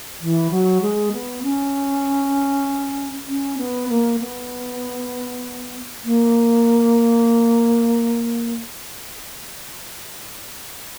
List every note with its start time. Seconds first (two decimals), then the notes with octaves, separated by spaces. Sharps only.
0.21 E3
0.50 F#3
0.82 G#3
1.12 B3
1.43 C#4
3.28 C#4
3.58 B3
3.89 A#3
4.20 B3
6.05 A#3